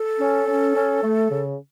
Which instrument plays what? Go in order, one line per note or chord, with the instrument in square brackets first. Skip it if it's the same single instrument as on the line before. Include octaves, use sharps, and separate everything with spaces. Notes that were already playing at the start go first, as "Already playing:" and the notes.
Already playing: [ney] A4
[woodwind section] C#4
C#4
C#4
A3
C#3